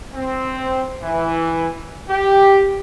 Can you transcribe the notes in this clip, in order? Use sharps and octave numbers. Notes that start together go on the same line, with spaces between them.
C4
E3
G4